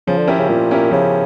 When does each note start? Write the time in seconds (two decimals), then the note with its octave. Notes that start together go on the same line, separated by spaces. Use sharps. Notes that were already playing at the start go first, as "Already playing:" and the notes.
0.07 C#3 F3
0.18 D3
0.27 C#4 E4 G4 A#4
0.39 C#3
0.49 A#2 F3
0.71 C#4 E4 G4 A#4
0.91 C#3 F3